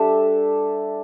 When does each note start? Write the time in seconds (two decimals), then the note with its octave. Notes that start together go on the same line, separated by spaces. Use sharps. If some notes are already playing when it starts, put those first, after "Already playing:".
Already playing: G3 D4 A4 E5